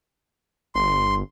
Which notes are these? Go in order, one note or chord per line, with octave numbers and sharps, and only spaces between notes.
G1 C6